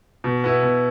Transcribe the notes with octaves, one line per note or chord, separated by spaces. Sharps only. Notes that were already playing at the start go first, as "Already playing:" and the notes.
B2
B3 E4
B2